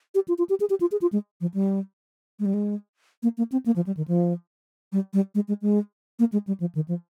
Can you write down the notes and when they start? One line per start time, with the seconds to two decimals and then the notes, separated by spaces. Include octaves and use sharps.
0.15 G4
0.28 F4
0.38 F4
0.50 G4
0.60 G#4
0.70 G4
0.81 F4
0.92 G#4
1.02 F4
1.13 G#3
1.41 F3
1.54 G3
2.40 G#3
2.46 G3
2.54 G#3
3.23 A#3
3.38 A#3
3.52 C4
3.66 A#3
3.76 F3
3.87 G3
3.97 D#3
4.08 F3
4.92 G3
5.13 G3
5.35 G#3
5.48 G#3
5.62 G#3
6.19 A#3
6.33 G#3
6.47 G3
6.60 F3
6.75 D#3
6.88 F3